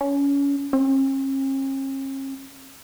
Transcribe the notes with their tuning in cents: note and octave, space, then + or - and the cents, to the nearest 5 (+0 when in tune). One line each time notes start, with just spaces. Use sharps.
C#4 +25
C#4 -45